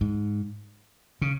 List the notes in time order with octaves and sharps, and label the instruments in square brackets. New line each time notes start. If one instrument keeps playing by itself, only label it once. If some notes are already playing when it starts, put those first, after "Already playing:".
[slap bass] G#2
C#3